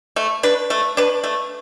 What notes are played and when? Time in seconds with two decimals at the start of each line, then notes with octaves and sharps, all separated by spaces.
0.16 A3
0.43 D4 B4
0.70 A3
0.97 D4 B4
1.24 A3